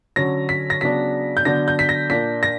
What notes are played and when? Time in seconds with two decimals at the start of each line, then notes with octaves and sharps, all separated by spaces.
0.16 D3 F#3 C#4 A#6
0.49 B6
0.70 A#6
0.81 C#3 F#3 B3 D4 B6
1.37 G6
1.45 D3 F#3 B3 D4 A#6
1.68 G6
1.79 B6
1.89 A#6
2.10 A#2 A#3 D4 B6
2.43 A#6